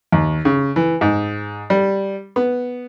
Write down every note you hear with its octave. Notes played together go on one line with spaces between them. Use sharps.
D#2
C#3
E3
G#2
G3
B3